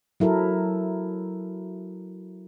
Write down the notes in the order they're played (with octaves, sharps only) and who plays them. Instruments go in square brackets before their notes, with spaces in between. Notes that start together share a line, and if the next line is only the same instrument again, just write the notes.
[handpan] F#3 E4 A4 A#4